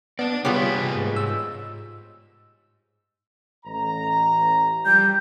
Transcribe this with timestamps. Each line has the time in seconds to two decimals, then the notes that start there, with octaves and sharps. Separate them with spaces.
0.19 B3 D5 A5
0.45 C3 G3 B3 F4 G#4 B4 C#5
0.95 G#2
1.16 E6
3.66 A1 A#5
4.86 F3 G3 G4 G6